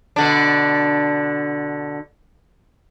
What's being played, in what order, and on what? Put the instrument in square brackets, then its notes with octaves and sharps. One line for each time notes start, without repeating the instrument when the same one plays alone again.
[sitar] B2 D3 D4